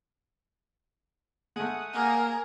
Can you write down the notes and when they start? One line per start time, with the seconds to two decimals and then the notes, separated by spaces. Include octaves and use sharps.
1.56 G#3 A3 F#5 D#6
1.93 A#3 G#4 A#4